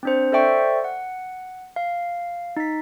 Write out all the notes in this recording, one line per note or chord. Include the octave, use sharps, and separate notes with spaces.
C4 D4 C5
A4 C5 D5 E5 G5 C#6
F#5
F5
D#4 B6